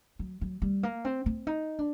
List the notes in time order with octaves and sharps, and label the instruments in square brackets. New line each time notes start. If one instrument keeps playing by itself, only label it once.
[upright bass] F#3
F#3
G3
A#3
C4
C4
D#4
D4